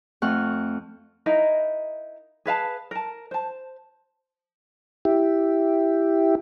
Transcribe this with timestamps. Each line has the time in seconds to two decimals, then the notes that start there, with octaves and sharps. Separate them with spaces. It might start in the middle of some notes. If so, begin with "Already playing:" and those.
0.22 F2 A3 F#5 C#6 F6
1.26 D#4 E4 A#4 F5
2.46 G#4 B4 F5 A5
2.91 A#4 A5
3.31 C5 A5
5.05 E4 G4